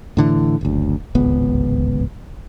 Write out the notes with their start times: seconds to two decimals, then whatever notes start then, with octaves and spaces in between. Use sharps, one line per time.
0.17 A2 D3 E3
0.61 F#1 D2
1.15 D1 G#1 C#2 B3